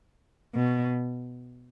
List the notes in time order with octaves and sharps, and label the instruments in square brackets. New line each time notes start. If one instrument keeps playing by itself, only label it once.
[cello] B2